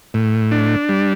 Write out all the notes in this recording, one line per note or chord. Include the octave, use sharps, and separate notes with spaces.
A2
D4
G3